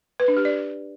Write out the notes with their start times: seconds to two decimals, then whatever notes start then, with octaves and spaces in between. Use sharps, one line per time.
0.20 B4
0.28 D4
0.37 G4
0.45 D5